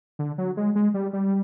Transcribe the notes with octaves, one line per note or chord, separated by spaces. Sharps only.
D3
F#3
G#3
G#3
G3
G3